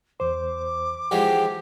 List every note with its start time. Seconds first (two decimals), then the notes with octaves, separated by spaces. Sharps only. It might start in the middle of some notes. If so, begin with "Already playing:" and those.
0.20 E2 C5 D6
1.11 E3 F3 G#3 G4 F#5